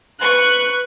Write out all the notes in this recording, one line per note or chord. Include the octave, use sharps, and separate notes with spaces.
B4 C#6 F#6